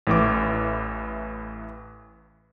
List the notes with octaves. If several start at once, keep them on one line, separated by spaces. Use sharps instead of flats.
A1 A2 E3 D6